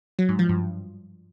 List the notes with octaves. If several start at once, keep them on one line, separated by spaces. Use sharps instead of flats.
F#3
G#2
F3
G2